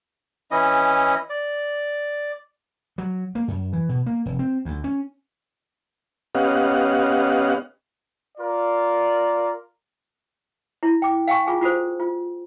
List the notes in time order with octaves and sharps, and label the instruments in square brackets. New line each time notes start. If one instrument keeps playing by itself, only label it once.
[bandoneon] E3 C#4 E4 D#5
D5
[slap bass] F#3
A#3
F#2
E3
B2
A#3
F1
C4
D2
C#4
[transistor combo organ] B3 C#4 G4 D#5 F5 F#5
[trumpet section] F4 A#4 D5
[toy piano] E4
G5 D6
F5 G5 G#5 C#6
F4 G#4 G#5
F4 F#4 A4 C5
F4